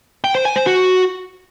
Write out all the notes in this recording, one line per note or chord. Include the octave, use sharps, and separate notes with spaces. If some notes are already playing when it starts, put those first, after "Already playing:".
G5
C5
G#5
C5
F#4